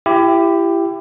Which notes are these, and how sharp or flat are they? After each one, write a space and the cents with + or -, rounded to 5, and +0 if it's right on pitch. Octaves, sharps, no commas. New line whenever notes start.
E4 +30 G4 +5